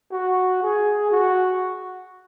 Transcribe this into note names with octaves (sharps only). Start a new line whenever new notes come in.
F#4
G#4
F#4